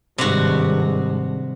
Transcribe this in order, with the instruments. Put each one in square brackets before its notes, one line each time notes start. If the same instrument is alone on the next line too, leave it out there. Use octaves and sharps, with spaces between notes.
[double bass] G#1 G2 [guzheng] C3 F#4